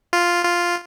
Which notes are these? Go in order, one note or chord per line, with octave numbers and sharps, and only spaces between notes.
F4
F4